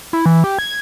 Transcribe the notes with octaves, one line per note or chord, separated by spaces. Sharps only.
E4
E3
G4
G#6